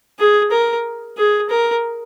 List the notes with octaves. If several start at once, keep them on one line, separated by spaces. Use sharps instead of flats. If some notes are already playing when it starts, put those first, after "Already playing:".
G#4
A#4
G#4
A#4